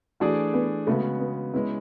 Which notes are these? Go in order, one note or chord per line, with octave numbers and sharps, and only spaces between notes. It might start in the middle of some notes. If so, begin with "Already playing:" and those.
E3 A3 D4 F#4 G#4 D5
B3
C#3 G#3 A3 B3 F#4
B3
G#3 B3 C#4 E4